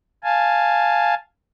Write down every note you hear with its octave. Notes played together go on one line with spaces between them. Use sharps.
F5 G#5 A5